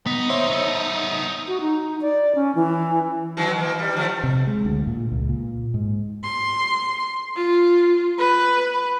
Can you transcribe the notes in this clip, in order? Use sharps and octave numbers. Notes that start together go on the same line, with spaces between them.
B3 D#4 B6
D#2 C5 C#5 E5 C6
B3 A4
F#4
D#4
D5
C#4
E3
D#3 E3 F#3
E3 A#3
G3
D#3 F3 A3
C3
G#3
D2
A#2
C#2
A#2
G#2
C6
F4
B4